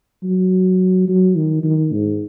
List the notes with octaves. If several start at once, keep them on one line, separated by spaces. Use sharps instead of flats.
F#3
F#3
D#3
D#3
G#2